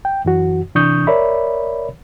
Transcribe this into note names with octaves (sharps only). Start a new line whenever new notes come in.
G5
F#2 E3 F#4
C3 E3 D4 C#6 D#6 G6
A#4 C#5 D5 E5 B5